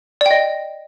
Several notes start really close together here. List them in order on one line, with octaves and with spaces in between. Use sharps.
D5 G5 D#5